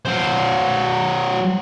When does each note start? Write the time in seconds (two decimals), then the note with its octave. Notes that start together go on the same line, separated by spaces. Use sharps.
0.05 F#3 C5